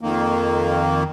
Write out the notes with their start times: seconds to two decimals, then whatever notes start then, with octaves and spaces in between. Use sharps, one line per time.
0.01 F2 D#3 A#3